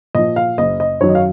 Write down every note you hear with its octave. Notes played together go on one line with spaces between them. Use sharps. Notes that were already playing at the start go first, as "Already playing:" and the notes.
A#2 F3 D#5
F5
F#1 D#5
D#5
F#2 D#3 F#3 C#5
D#5
F5